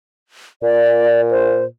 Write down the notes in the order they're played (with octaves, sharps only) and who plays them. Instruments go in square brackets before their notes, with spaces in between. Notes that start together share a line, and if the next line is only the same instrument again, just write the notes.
[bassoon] A#2 [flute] D5
[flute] C5